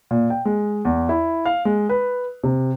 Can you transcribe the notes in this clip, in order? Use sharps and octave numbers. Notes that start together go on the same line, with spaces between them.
A#2
G5
G#3
E2
E4
F5
G#3
B4
C3